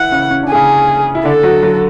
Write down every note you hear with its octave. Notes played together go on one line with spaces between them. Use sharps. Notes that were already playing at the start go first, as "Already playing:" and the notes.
Already playing: E3 E4 F#5
C#3 C#4
C#4
D4
G#4
C#3 C#4
E4
D3 D4 A4
F#3 F#4
F#3 F#4